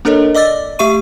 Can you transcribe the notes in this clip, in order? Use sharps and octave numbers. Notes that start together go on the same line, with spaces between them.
A#3 D4 A4 A#4 C#5 D#5
D5 D#5 D6 E6 A6
A3 G4 E5 C#6 D#7